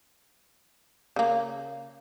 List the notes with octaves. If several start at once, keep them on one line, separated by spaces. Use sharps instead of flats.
C#3 A#3